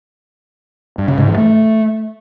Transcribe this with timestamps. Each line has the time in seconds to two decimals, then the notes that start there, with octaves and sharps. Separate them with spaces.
0.98 G2
1.08 C#3
1.18 G#2
1.28 E3
1.37 A3